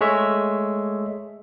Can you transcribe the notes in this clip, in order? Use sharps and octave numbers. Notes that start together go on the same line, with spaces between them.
G#3 A3 C#5 E5